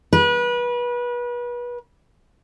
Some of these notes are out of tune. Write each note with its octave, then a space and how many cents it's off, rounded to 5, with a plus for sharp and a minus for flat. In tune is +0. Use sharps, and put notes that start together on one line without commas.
B4 -30